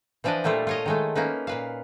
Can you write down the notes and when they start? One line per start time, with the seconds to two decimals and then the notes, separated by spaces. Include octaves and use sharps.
0.24 E3 F3 D4 B4 D5 D#5
0.44 A#2 G3 A3 E4 F4
0.67 F4 C#5 D#5
0.86 D#3 G#3 A3
1.15 A#3 C#4 D#4 B4
1.47 A#2 B4 F5